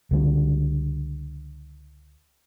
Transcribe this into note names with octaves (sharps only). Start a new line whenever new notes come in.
C#2 D3 G3